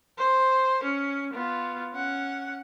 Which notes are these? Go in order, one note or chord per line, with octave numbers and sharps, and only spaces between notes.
C5
C#4
B3 F4
C#4 F#5